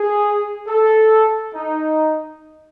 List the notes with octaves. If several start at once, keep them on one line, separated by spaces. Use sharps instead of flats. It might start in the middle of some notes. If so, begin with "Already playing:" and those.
Already playing: G#4
A4
D#4